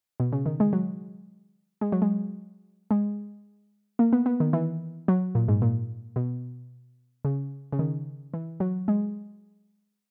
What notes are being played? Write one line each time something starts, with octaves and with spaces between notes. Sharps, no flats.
B2
C#3
D#3
G#3
F#3
G#3
F#3
G#3
G#3
A#3
B3
B3
D#3
E3
F#3
A#2
G#2
A#2
B2
C#3
C#3
D#3
E3
F#3
G#3